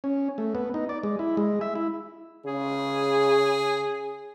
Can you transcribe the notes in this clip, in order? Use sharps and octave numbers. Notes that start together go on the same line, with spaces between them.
C#4
A3
B3
D#4
D5
G#3
E4
G#3
E5
E4
C#3 G#4